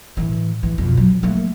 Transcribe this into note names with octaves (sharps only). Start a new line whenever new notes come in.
A2 E3
E3
F2 B2
F#3
A3 A#3